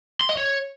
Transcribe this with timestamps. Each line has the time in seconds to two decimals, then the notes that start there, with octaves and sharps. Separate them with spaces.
0.21 C6
0.29 D#5
0.37 C#5